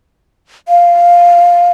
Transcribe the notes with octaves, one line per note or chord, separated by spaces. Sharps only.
F5